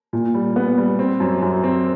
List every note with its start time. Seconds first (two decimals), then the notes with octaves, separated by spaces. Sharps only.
0.13 A#2
0.34 G3
0.56 B3
0.78 G3
0.99 C4
1.20 F#2
1.43 F#2
1.64 C4